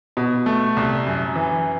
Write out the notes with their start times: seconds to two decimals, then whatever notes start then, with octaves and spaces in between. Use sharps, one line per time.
0.17 B2
0.46 A3
0.77 C2
1.07 F#2
1.36 E3